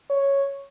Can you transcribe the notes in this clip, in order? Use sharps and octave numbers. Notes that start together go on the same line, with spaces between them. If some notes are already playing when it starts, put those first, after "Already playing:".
C#5